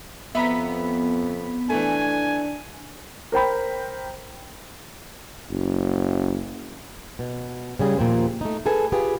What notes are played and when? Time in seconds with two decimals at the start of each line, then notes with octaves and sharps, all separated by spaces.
0.35 F2 B3 E5 A#5 B5 B6
1.70 E3 A3 D4 G#5
3.32 A#4 C5 G5 B5
5.51 F#1
7.19 B2
7.79 C#3 G3 G#4
7.98 D#2 A#2 F3 C4
8.41 A3 D#4
8.66 G#4 A4 B4 G#5
8.92 F4 G4 G#4 B4